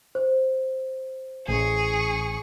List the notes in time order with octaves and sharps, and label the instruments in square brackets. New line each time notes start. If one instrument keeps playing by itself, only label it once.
[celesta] C5
[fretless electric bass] A1 [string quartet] G#4 C#6